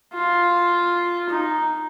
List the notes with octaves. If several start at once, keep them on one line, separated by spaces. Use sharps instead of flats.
F4
D#4